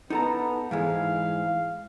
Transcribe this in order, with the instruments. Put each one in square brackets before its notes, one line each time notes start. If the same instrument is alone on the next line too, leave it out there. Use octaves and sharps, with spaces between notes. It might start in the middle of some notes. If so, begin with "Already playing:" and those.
[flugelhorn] B3 [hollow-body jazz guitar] D#4 A4 A#5
[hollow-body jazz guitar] G#2 E3 G#3 [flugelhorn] F5
[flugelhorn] F5